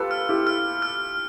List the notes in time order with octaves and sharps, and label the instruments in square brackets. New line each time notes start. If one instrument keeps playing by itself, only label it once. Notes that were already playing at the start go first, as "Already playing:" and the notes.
Already playing: [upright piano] F4 G4 A4 B4
[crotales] F6
[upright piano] E4 G4
[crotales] F6
F6